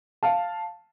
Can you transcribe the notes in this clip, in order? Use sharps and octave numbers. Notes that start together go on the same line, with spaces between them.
F5 A5